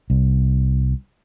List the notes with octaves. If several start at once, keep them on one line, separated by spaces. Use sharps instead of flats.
C2